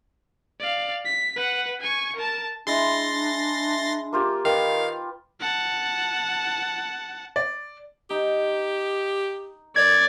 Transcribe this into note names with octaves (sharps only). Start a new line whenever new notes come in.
D5 F5
B6
B4 F#5
G#5 C#6
A#4 A5
G#3 D4 E4 C6 A6 A#6
A#3 F4 G4
D#3 B4 F5 G5
F#5 A5
D5
D#4 G4
F#2 D5 G#6